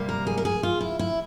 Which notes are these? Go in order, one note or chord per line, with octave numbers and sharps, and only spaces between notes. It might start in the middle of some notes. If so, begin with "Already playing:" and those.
Already playing: C3 G3 A#3
A#4
G#4
A#4
G#4
F4
E4
E4